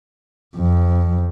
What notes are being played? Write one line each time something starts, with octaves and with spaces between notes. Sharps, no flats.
F2